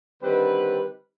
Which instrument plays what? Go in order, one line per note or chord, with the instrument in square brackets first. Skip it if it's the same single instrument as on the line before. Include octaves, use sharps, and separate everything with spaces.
[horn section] D3 D#3 G3 C4 B4